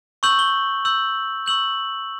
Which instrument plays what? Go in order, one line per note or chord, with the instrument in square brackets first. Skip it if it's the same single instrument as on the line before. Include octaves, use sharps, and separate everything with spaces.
[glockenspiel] C#6 E6 G6 F#7
G7
C#6 E6 G6 F#7
C#6 E6 G6 F#7